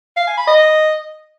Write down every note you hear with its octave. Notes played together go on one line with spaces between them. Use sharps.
F5
G#5
B5
D#5